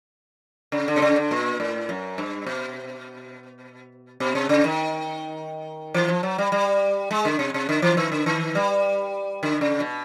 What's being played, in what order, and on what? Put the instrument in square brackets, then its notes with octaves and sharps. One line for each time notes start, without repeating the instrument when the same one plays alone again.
[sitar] C#3
D3
C3
C#3
D3
A#2
A2
F#2
G2
B2
B2
C3
C#3
D#3
E3
F3
F#3
G3
G3
G#3
D3
C3
C3
D3
E3
D#3
D3
D#3
G3
D3
C#3
B2